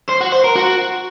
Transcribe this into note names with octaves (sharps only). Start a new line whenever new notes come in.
C5
F#4
C5
A#4
F#4